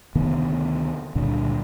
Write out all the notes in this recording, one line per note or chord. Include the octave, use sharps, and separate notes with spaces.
D2 C3 D#3 B3
C#2 G2 A#2 D3